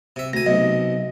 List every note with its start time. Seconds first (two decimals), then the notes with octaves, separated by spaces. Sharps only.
0.16 C3 E5
0.33 D2 G#5 A#6
0.46 B1 C3 D#5